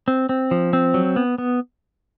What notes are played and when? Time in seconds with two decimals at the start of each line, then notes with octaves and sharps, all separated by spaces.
0.08 C4
0.29 C4
0.51 F3
0.73 C4
0.94 F#3
1.16 B3
1.38 B3